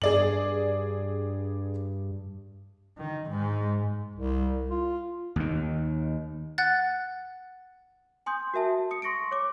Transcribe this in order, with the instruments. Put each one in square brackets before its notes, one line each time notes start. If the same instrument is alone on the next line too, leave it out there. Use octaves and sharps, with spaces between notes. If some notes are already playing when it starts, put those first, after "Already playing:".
[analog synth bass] G2 [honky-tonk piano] G#4 D5 F#7
[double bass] D#3
G#2
[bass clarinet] C2
F4
[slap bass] D#2 D#3
[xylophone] F#5 F#6 A6
[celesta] G#5 C6 D#6 G6
F#4 A#4 E5 A5
D#6 C#7
C6 C#6 A#6 C#7 D7
C#5 D6